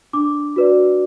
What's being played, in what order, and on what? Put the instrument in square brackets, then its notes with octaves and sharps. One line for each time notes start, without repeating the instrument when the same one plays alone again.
[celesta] D4 D6
F#4 B4 D5